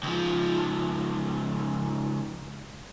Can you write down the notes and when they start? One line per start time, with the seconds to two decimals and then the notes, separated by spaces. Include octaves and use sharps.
0.03 C#2 F3